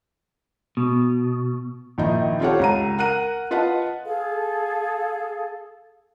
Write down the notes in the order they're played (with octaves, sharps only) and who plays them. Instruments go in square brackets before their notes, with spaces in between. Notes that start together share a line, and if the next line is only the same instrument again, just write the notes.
[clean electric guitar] B2
[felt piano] A#1 D#3 E4 D#5
C4 F4 G4 A4 C#5 F#5
C#2 A#5 D#7
A#4 F#5 A#5 F#6 D#7
F4 B4 D#5 F#5 A5
[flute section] G#4 A4 F5